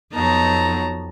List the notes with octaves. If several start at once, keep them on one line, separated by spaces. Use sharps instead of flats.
F2 F#3 B3 D#4 A5 A#5